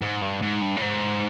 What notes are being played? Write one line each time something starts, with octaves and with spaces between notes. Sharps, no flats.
G#2
G2
G#2
G2
A2
G#2